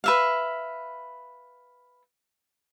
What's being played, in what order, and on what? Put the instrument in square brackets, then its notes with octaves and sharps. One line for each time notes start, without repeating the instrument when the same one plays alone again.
[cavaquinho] B4 E5 F5